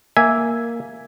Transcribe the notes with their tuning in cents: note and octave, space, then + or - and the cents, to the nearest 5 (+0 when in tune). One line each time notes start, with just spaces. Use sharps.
A#3 +0 E5 +0 G#5 +0